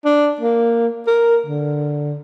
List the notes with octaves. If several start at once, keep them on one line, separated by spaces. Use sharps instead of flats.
D4
A#3
A#4
D3